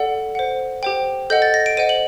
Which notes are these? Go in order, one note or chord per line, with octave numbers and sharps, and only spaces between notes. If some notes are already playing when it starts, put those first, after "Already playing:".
Already playing: A4 D5 F#5
C5 F#5
G4 C5 G5
A4 D#5 F#5 G6
A6
A#6
D7
C5 D#5 F#5 D#7
F#7